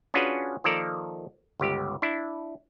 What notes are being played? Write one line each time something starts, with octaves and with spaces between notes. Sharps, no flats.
C#4 D4 F4 F#4 G#4 B4
D#3 F3 A#3 A4 A#4 D5
G1 C#2 G4
D4 E4